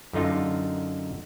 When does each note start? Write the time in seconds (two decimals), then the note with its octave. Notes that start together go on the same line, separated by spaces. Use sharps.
0.13 F#2 D3 D#4 F4